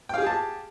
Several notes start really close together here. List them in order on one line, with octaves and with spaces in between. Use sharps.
G5 F5 G#4 G4 A5